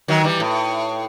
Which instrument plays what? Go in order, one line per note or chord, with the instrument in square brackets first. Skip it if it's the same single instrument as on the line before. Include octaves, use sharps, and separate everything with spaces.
[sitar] D#3 F#3
E3 G3
A2